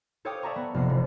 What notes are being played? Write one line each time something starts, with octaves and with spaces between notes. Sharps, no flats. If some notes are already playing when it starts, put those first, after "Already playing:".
A4 C#5 F5 G5 D6 D#6
D5 E5 A5 A#5 C#6 D#6
B3
F1 A#3 B3 C7
E1